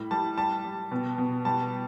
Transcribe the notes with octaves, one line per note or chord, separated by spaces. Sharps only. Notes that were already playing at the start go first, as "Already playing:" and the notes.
Already playing: A2 G3 B5
G3 A5
G3 A5
G3
B2
B2
G3 A5